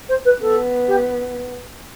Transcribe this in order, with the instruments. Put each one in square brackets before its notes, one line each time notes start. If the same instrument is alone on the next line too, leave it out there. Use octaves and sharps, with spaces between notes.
[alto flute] C5
B4
[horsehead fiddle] B3 [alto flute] A4
[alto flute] G4